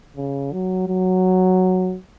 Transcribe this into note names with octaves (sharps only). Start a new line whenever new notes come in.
C#3
F#3
F#3